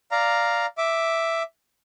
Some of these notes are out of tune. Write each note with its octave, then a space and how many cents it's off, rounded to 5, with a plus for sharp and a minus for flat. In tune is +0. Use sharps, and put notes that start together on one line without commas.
D5 +0 F5 +0 A#5 +0
E5 +0 D6 +0